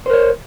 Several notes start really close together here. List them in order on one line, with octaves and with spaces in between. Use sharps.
C5 A#4 C#5